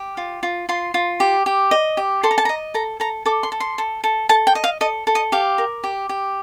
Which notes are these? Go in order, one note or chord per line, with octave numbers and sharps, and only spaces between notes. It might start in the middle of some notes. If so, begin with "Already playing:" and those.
Already playing: G4
F4
F4
F4 C6
F4
G4
G4
D#5
G4
A4 C6
A#5
A5
A#5
D#5
A4 A#5
A4 A#5
A4 D6
C6
A4
C6
A4
A4
A4 A5
G5
D#5
F5
A4 D#5
A4
D#5
G4 F5
A#4
G4
G4